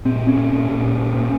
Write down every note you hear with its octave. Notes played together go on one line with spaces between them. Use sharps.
A#2 C4
A#2
C#4
A#2
A#2
A#2
A#2
A#2
A#2